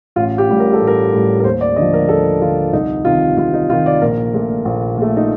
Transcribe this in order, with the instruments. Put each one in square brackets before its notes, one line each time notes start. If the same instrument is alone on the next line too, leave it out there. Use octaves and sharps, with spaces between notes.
[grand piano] A1 F4
G4
A2 G3
A#4
A4
A1
A#4
A2 G3
A#4
D#2 C5
D5
D3 F3 D#5
A#4
D#2 A4
D3 F3 F4
C2 D#4
C3 D#3 F4
C2 F4
D#4
C3 F4
D#3
D5
A#1 A#4
A#2 A3
A#1
A#2 A3
D#4